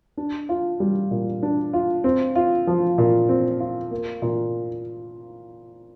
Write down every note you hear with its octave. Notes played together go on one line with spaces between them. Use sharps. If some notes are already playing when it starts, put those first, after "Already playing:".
D4
F4
G3
A#2
D4
F4
C4
F4
F3
A#2
C4
F4
A#3
A#2